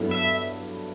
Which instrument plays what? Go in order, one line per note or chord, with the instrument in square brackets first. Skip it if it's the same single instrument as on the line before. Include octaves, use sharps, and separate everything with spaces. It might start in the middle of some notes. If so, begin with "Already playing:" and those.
Already playing: [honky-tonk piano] G2 F#3 B3 E4 A4
[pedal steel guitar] E5